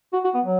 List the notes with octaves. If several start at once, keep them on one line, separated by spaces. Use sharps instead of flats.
F#4
F#4
B3
F#3